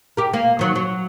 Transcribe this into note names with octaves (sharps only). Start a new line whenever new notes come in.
G4 A#4
A#3
D#3 F#3
F#3